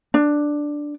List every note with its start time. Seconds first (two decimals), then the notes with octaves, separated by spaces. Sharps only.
0.14 D4